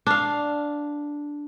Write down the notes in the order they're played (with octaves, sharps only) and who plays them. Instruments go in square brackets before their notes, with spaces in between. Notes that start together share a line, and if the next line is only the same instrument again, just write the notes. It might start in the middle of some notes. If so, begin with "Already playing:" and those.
[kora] D4 F5